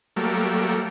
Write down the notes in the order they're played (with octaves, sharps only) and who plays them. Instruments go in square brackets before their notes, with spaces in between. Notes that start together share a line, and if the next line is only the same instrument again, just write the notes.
[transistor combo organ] F#3 G3 A3 A#3